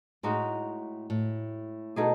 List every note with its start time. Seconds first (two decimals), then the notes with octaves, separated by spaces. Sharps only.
0.23 A2 G#3 D#4 F#4
1.10 A2
1.96 B2 A3 D#4 G#4